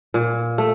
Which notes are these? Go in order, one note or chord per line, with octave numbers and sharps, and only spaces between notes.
A#2
A3